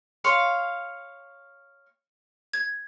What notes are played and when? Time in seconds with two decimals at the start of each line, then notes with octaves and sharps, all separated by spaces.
0.24 C#5 F5 C6
2.54 G#6